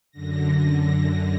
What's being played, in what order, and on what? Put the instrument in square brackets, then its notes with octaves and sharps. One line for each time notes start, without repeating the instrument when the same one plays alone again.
[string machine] F#2 D3 A#6